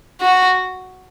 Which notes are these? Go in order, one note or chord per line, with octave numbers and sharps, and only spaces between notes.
F#4